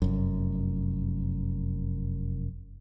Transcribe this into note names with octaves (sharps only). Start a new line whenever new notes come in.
F1 F#2